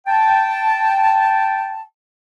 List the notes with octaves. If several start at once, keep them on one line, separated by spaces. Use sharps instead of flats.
G5 A5